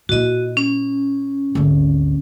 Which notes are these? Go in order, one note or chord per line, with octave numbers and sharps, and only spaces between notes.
A#2 E4 F#4 D#5
C#4
G#1 D2